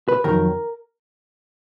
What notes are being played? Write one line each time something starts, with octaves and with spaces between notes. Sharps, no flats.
B4
F2 D#3 F#3 A#4